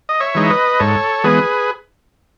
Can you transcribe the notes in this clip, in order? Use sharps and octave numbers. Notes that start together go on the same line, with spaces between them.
D#5
C#5 E5
E3 G#3 D#4
E5
B4 D#5
G#2 A4 C#5
E3 G#3 B3 G#4 B4